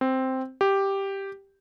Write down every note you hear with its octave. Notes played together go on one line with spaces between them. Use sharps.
C4
G4